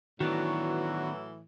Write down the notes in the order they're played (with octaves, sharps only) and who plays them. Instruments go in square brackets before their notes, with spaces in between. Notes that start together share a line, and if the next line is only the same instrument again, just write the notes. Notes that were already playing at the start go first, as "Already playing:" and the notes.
[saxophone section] A2 E3 [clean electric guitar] D#3 B3 D4 [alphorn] F#3 [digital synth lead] F#4